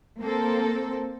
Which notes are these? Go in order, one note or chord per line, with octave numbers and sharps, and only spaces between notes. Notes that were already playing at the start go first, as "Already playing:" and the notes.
A#3 C4 A4